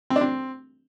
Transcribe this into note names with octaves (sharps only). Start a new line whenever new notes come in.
C4
D4
C4